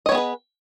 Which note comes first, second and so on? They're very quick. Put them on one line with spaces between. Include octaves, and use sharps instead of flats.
D#5 C#5 B3 G#4 B4